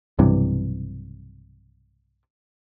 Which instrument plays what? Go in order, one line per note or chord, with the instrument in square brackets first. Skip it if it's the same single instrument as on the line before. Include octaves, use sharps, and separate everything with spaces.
[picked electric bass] B1 G2 C3 E3